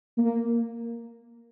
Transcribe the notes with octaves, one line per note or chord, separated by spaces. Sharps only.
A#3